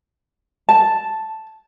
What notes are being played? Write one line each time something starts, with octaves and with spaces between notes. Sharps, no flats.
A5